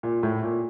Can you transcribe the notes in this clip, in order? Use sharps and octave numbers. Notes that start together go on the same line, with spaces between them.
A#2
A2
A#2